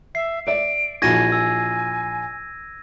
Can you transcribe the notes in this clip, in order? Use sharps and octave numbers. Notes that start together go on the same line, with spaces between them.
E5 C7
D5 E5 D7
A#1 E3 F#4 G#5 G#6 A#6 D#7
G#5 E6